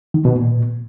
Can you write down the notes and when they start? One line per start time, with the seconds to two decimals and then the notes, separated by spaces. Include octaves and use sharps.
0.14 D#3
0.25 B2
0.36 A#2